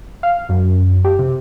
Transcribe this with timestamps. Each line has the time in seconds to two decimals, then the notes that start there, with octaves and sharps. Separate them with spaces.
0.23 F5
0.49 F#2
1.05 G4
1.19 C3